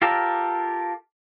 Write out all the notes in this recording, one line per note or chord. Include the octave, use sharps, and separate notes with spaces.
F4 G4 A4 A#4 D5